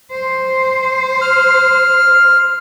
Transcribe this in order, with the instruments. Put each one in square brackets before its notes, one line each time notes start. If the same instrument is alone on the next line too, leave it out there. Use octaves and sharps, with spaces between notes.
[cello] C5
[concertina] F6